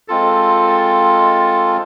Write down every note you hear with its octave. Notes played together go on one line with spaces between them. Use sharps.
G#3 C4 F4 A4